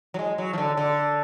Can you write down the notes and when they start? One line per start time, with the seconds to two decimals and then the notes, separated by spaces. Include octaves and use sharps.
0.14 F#3
0.19 G#3
0.38 F#3
0.53 F3
0.58 D3
0.77 D3